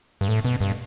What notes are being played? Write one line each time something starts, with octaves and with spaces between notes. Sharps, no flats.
G2
A2
B2
G2